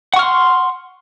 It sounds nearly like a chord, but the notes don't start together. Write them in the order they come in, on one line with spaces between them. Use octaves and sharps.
F#5 C#6 F6 C6